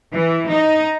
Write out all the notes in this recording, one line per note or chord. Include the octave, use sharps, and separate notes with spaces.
E3
D#4